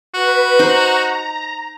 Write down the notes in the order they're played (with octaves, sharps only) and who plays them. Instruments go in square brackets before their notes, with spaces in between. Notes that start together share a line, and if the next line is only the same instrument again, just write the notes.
[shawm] F#4 [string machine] B4
[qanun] D#4 C5 [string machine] A#5